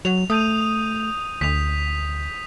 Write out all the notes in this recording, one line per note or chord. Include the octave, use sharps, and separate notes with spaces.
F#3 F7
A3 D#6 G6 D#7
D2 B6 F7